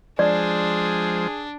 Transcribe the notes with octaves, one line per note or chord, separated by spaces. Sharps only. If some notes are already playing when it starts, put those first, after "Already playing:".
F3 G#3 D4 G#4 C5 D5